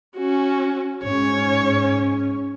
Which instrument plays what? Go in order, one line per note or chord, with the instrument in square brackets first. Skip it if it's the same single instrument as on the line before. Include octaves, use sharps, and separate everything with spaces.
[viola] C#4 F#4
[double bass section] G#2 C#4 [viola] C#5